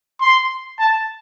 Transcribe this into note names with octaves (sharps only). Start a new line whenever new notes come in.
C6
A5